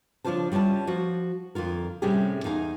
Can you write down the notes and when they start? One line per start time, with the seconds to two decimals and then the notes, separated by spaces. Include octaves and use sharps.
0.25 C#3 F3 D4 F4 C5 A5
0.52 G3 C#4 E4 F4 A5
0.87 F3 F#4
1.55 F2 D3 F4 A#4
2.02 A2 C3 G3 C#4 G4 G#4
2.44 E2 D#4 F5 G#5